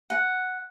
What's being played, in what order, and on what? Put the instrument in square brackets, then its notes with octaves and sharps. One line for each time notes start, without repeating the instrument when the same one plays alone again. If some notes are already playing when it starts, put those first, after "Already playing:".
[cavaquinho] F#5